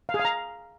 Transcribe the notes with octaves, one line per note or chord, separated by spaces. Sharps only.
F5
G#4
F5
A#5